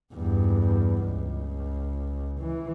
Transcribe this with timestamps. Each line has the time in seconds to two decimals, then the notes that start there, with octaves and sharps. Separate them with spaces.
0.13 E2 G2
1.05 C#2
2.40 E3